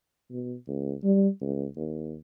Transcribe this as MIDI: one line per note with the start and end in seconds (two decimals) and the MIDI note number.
0.31 0.54 47
0.68 0.94 37
1.04 1.28 55
1.41 1.66 37
1.76 2.16 39